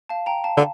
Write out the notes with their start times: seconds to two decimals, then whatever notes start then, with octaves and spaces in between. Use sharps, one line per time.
0.09 F5 A5
0.26 G5 A#5
0.44 F5 A5
0.57 D3